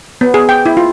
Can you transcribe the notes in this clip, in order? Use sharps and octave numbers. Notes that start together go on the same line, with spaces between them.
B3
G#4
G5
E4
F4